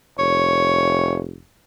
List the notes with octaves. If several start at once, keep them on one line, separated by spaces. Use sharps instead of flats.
F1 C#5